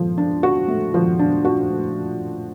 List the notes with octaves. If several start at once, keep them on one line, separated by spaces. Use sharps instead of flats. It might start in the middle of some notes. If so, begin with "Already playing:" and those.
Already playing: F3
D4
F#4
A3
F3
D4
F#4